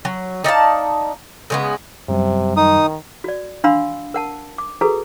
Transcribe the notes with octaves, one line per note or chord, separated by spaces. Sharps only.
F#3
D#4 D5 F5 A5
C#3 G#3 B3
F#2 C3 F#3 G3
D#3 D#4 D#6
F#4 D5
D4 F5 F#5 B5 C6 E6
A#4 F#5 A5
D6
F#4 G#4 A4 B4 A#5